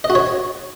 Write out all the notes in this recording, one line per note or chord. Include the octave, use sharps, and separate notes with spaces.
D#5
F#4
C#5